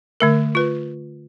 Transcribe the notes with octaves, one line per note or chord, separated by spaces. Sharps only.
D3 A3 A#4
F4 B4